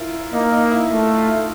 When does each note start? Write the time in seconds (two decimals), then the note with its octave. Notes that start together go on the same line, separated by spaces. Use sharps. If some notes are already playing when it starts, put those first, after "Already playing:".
Already playing: E4 F4 A#4
0.33 A#3 D#4
0.52 D#4
0.71 E4
0.90 A3 F4
1.18 F4